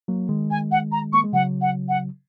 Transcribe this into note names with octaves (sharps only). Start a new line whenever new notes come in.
F#3 A#3
D#3 G#3
G#5
F#5
A#5
A#3 C#6
G#3
C#3 F#3 F#5
F#5
F#5